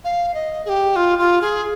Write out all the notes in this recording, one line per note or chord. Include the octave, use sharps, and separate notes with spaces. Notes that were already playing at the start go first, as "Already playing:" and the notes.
F5
D#5
G#4
G4
F4
F4
G#4